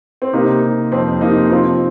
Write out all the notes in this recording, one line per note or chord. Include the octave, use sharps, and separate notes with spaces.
C4
C3 A#3 D#4
C3
F2 C4
C3 A#3 D#4
F3 C4 F4